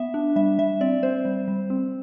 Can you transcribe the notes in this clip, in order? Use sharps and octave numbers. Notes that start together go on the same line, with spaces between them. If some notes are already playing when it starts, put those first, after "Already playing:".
Already playing: B3 E5
D4
G3 E5
G3 E5
C4 D5
C4 C5
G3
G3
C4